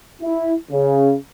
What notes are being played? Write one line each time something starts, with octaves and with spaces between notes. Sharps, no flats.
E4
C#3